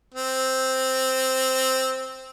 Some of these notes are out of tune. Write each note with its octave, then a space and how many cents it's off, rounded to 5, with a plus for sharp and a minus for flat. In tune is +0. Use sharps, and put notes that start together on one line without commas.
C4 +0